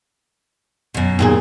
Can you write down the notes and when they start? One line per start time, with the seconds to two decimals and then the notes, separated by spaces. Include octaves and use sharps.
0.94 F#2 B2
1.19 D#2 A#2 G#4